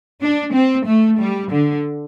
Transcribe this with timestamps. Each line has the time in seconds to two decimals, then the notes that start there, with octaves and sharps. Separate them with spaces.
0.22 D4
0.53 C4
0.86 A3
1.19 G3
1.52 D3